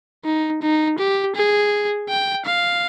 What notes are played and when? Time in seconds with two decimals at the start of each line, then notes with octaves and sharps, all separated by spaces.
0.25 D#4
0.62 D#4
0.98 G4
1.35 G#4
2.09 G5
2.45 F5